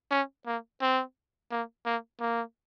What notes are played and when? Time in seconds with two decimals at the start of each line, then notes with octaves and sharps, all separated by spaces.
0.11 C#4
0.46 A#3
0.81 C4
1.51 A#3
1.85 A#3
2.20 A#3